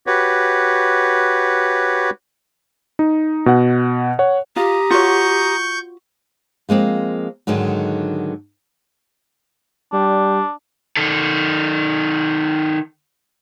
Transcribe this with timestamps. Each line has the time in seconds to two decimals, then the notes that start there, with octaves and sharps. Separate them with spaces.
0.07 F#4 G4 B4 C#5
2.99 D#4
3.46 B2 F#5
4.19 C#5 F#5
4.56 F4 G4 A#5 D#6
4.91 F4 F#4 C#5 C#6 G6
6.69 F3 G#3 A#3 C4
7.47 G#2 D3 D#3 F#3 G#3
9.93 G3 D4
10.97 D#3 A4